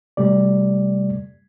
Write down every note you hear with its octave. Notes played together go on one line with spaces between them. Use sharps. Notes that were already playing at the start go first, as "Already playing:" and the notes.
C3 G3 A3 D5